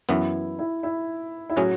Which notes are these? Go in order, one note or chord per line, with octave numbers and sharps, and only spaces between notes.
F#2 E3 B3 E4
E4
E4
E4
A2 F#3 C#4 F#4 G#4